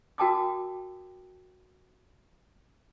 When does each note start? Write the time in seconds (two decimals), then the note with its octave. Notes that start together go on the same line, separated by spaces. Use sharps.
0.18 F#4 A#4 G5 A5 D6 D#6